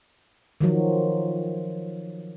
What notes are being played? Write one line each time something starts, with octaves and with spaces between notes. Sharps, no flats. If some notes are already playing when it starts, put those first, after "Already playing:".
D#3 F3 F#3